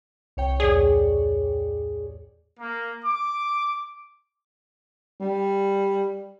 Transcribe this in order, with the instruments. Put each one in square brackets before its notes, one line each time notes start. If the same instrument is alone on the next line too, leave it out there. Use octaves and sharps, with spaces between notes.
[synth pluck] C2 C#5 G5
[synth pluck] E2 A2 D5 [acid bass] G#4
[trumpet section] A#3
D6
[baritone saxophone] G3